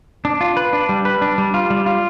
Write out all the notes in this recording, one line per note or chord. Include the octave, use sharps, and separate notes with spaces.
D4
F4
B4
D4
G3
B4
D4
G3
F4
G3
F4